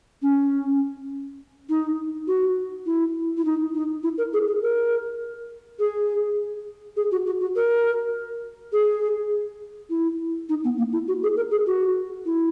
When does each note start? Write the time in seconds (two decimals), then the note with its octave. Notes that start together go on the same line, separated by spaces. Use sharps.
0.22 C#4
1.69 D#4
2.27 F#4
2.86 E4
3.37 E4
3.45 D#4
3.74 D#4
4.03 E4
4.18 A#4
4.33 G#4
4.47 G#4
4.62 A#4
5.79 G#4
6.96 G#4
7.12 F#4
7.26 F#4
7.40 F#4
7.56 A#4
8.72 G#4
9.90 E4
10.49 D#4
10.64 B3
10.78 A#3
10.92 E4
11.08 F#4
11.23 G#4
11.36 A#4
11.51 G#4
11.67 F#4
12.26 E4